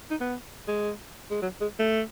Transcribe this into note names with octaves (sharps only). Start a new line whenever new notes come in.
D#4
B3
G#3
G#3
F#3
G#3
A3